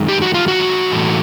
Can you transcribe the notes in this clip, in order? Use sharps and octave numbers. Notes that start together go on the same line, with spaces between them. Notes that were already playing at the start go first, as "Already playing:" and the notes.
Already playing: F#2 D#3 G#3
G4
F#4
F4
F#4
A2 E3 A3